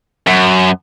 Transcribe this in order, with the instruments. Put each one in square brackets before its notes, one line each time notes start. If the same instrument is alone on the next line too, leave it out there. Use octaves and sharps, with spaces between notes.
[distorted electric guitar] F#2